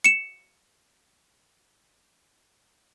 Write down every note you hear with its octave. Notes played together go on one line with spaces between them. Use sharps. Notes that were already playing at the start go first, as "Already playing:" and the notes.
C#7 E7